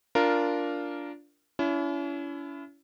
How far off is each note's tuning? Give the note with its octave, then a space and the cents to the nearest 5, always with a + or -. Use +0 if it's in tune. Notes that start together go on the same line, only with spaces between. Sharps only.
D4 -15 F4 -10 A#4 +0
C#4 +40 E4 +25